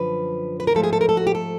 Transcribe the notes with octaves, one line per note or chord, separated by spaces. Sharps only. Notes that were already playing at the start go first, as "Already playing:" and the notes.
Already playing: F#2 D3 F3 B4
B4
A#4
G#2 F3 A3 A4
G#4
A4
A#4
A4
F#4
G4
A4